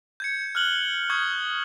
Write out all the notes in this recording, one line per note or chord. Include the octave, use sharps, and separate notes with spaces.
G6 G#6 C#7
F6 F#6 F#7 G7
C#6 D#6 G6 G#6